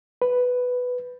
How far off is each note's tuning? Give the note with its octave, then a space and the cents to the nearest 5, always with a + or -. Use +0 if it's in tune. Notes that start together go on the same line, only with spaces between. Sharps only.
B4 +5